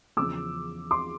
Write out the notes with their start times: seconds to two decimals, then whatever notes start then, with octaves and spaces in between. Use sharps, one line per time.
0.17 E2 C#3 F3 D6 E6
0.91 C6 D6